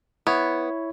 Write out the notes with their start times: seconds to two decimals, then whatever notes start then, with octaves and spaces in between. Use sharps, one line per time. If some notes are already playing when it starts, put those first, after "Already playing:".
0.27 B3 E4 C#5